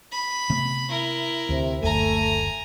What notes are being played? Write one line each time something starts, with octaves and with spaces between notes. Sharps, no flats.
B5
C3 A3 B3
E4 A#4
D2 C3
F#1 D2 A3 G#5 A#5